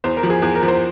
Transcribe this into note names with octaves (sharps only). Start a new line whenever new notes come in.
E2 C5
A#4
F3
G#4
E2 G#4
A#4
F3
C5